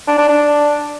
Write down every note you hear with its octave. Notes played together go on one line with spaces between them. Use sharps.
D4
D4
D4